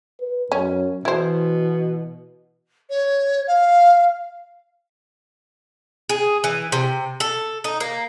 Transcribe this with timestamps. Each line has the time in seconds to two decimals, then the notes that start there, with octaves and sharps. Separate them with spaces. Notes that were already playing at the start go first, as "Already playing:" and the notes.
0.20 B4
0.52 F#2 C#4
1.05 B2 E3 E4 C5
2.90 C#5
3.47 F5
6.09 G#4
6.44 E3
6.72 C3
7.20 A4
7.64 D#4
7.80 A#3